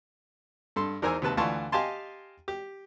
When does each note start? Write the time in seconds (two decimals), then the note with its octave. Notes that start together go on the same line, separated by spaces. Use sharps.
0.76 G2 A4 C6
1.02 E2 D#4 A#4 C5 G#5 E6
1.22 D#2 C3 B4 A5
1.37 D2 E3 F4 A5 C6 C#6
1.72 G4 D#5 F5 G#5 A5 C6
2.48 G4